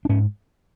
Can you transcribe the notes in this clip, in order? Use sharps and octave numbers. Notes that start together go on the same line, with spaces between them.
D4
G#2 C#4